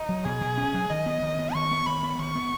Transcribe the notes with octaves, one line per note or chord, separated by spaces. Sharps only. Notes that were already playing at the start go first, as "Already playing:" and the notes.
Already playing: D#4
F#3
B2 G#4
B2
C#4
F#3
D#3 D#5
B3
D#3
B3
D#3 C#6
B3
D#3 B5
B3
D#3 C#6
B3